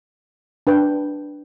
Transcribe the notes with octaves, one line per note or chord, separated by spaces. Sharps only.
D4 B4 G5